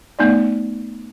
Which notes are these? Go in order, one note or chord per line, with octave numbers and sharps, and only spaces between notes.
A3 B3 D#4 D5